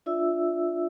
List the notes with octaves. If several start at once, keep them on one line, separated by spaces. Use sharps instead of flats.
D4 F4 D5 E5 E6